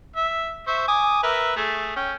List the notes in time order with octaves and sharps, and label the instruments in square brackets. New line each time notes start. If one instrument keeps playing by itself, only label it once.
[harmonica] E5
C5 E5 C#6
G#5 D6 D#6
A#4 B4 E5
A3 G#4
C#4 G5